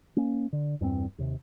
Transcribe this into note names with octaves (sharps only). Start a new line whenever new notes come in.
A#3 C#4
D3
E2 G2 A3 C4
D#2 C3